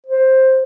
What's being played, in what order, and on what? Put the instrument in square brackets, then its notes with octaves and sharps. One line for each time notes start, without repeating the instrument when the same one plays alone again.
[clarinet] C5